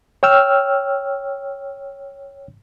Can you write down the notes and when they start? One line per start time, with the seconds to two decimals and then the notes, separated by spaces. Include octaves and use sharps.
0.23 C#5 G5 E6 F6